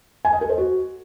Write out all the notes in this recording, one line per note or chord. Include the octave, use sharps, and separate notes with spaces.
G#5
D#5
A4
C5
F#4